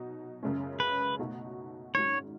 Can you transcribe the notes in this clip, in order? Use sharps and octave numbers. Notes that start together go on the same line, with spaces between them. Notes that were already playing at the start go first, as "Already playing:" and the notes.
Already playing: B2 F#3 D#4
F#2 C#3 G#3 C#4
B4
B2 A3 D#4 F#4
G#1 G#2 F#3 C#4 C#5